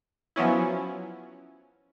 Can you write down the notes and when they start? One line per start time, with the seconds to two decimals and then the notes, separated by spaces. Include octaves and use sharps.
0.36 F3 F#3 B3 C#4 E4